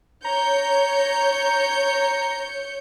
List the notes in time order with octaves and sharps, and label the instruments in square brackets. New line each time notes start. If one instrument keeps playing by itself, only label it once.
[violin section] C#5 G6 C#7 [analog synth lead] A#5